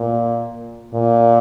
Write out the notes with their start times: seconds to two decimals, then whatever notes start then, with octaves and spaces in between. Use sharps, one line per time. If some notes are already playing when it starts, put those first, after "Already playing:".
Already playing: A#2
0.94 A#2